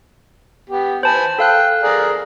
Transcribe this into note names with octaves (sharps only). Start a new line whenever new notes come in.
B3 G4
B4 C5 G#5 A5
A4 F5 G5 F#6
G#4 A#4 D5